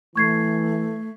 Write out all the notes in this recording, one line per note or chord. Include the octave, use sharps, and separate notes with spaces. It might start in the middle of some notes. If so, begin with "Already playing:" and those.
E3 A3 C#6 G#6 C7